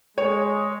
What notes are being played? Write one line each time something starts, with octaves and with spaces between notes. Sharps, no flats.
G#3 C#5